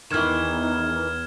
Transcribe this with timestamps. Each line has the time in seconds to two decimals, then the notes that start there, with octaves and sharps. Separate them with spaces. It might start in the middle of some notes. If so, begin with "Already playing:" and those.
0.11 E2 D#3 E3 D#4 F6 G#6 E7